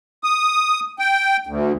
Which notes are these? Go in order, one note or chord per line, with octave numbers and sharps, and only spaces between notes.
D#6
G5
D2